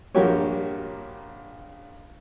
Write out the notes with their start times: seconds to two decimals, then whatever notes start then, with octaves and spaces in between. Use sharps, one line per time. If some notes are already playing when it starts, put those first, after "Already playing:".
0.15 A#1 G2 F#4 G4 A#4 C#5